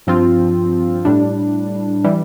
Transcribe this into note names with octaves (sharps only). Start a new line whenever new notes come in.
G2 F3 C4 F4
A2 G3 D4
E3 G3